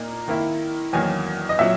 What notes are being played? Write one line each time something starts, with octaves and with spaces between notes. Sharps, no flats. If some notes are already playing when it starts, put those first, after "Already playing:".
Already playing: A#2 A#3 D#4 A#5
D#3 A#3 E4
E2 D#3 F#3 A#3 G#5
D#5
A#2 F#3 E5